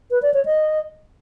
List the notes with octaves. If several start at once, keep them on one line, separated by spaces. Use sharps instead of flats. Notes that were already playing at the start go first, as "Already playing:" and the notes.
B4
D5
C#5
D#5